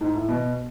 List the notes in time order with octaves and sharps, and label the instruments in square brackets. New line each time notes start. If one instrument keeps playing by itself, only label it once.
[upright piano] G#2
A2
B2